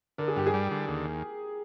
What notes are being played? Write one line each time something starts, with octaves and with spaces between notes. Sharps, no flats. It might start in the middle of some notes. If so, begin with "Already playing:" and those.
D3 A#4
G#4
G2 G4
G#4
G3
D3
D#2